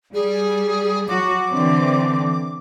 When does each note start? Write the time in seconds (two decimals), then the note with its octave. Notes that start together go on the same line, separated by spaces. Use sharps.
0.14 G3 G#4
1.08 F#3 F#4 D6
1.50 D3 E3 C4